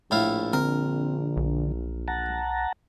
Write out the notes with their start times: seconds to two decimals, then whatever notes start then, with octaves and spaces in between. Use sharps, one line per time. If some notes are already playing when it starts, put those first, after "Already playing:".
0.11 A#1 A2 E4 F5
0.53 D3 C4 A#4 D#6
1.37 B1
2.08 F#5 A5 A#5